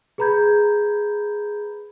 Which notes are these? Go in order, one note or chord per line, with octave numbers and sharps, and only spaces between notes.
G#4 B4 A#5 B5 G6 G#6